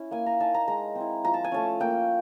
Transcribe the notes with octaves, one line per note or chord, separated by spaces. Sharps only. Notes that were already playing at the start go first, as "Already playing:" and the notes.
Already playing: C#4 E4
A#3 G#5
A#5
D#4 A5
A#5
G#3 A#5
C4
E4
F3 A#5
A5
G#5
A3 C#4 A5
A#3 G5